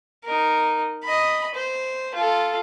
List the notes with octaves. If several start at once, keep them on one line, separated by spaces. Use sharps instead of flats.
D#4 A#4
D#5 B5
C5
F4 A4